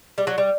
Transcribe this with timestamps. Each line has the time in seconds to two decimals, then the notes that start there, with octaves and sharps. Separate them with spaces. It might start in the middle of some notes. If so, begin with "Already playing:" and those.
0.18 G3
0.27 F#3
0.38 G3